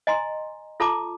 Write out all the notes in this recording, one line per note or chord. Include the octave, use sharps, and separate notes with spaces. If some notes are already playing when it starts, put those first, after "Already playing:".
D#5 G#5 A#5 C6
F4 A4 A5 A#5 D6